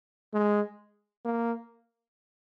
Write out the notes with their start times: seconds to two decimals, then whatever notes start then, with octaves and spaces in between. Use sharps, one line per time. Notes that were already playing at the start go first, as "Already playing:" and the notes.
0.33 G#3
1.25 A#3